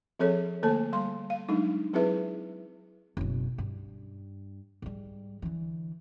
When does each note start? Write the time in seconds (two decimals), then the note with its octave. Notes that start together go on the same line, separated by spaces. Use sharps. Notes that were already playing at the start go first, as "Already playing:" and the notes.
0.19 F3 C4 G#4 A4 C#5
0.63 D3 A3 A#3 A4 A5
0.93 G3 C6
1.30 F5
1.49 F#3 G#3 D4 D#4
1.93 F#3 C4 E4 G#4 B4 E5
3.17 F#1 B2
3.58 G2
4.82 G#2 G3
5.42 D3 E3